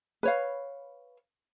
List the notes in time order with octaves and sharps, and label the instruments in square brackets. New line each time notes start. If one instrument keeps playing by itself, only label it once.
[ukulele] B4 C#5 F5